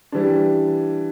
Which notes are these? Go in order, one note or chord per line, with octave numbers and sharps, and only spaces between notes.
E3 G3 D4